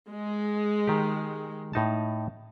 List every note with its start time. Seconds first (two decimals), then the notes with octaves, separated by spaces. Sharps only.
0.10 G#3
0.87 D#3 G4
1.73 A2 D#4 A5